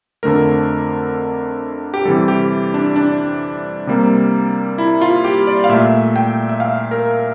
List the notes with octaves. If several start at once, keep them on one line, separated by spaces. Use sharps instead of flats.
F2 D3 A3 A#4
G4
C3 E3 G3 A4
G4
D4
D4
C3 G3 A#3
E4
F4
G4
D5
F5
A#2 A3 E5
G5
E5
F5
A#4